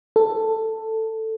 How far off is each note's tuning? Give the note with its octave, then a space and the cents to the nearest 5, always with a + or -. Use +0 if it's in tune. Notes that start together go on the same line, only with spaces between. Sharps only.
A4 +10